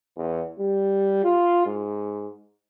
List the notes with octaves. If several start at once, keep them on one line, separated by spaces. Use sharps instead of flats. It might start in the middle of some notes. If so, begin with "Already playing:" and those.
E2
G3
F4
G#2